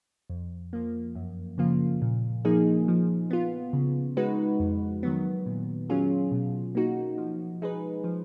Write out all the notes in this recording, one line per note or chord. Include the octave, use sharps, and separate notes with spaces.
F2
F3 A#3
F#2
C#3 F3 A#3 F4
A#2
F3 A#3 D#4 G#4
F3
B3 F4
C#3
G#3 D#4 F#4 B4
F2
D#3 F#3 B3
A#2
F#3 C#4 F4 G#4
B2
A#3 D#4 F#4
F3
G#3 D#4 G#4 B4
F3